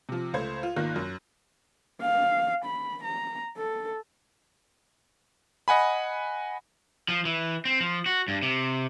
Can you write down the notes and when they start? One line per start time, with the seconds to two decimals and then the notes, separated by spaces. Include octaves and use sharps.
0.09 C3 F3
0.34 C#2 A3 C5 G#6
0.63 F4
0.76 G#1 D#3 A#3 F4 F#6 A#6
0.96 F#2
2.01 F5
2.65 B5
3.04 A#5
3.58 A4
5.68 D#5 F#5 G#5 B5
7.08 F3
7.25 E3
7.65 C4
7.80 F3
8.06 F#4
8.28 G2
8.42 C3